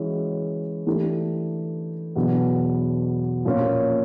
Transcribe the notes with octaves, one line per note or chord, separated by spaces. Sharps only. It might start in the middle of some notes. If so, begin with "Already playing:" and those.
Already playing: E3 G#3 C#4 F#4
E3 A3 D4 G4
E2 B2 F#3 B3 D4
A#2 F3 A#3 C#4 F4